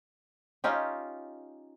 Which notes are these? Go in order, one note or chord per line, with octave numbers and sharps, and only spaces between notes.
C#4 D#4 F4 G4